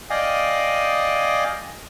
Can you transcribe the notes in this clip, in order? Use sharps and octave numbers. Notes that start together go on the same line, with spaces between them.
D5 D#5 F5 G5 G#5 D#6